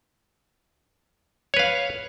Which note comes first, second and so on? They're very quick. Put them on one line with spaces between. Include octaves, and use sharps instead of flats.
C#5 B4 F5